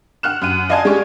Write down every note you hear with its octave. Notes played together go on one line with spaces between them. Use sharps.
F#5 F6 F#6 E7
F#2 F#5 D#7
D5 D#5 F5 G#5 A5 G#6
G#3 C#4 G4 D5 C#6